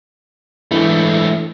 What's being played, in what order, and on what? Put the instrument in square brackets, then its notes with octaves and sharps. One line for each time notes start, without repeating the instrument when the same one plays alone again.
[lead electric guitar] G#2 A3 [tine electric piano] E3 D4 E4